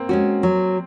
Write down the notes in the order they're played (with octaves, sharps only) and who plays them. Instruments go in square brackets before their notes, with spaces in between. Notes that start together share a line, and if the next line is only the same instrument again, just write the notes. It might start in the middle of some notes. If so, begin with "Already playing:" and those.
Already playing: [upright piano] A#3 C4
[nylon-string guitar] G#3 C#4 F#4
F#3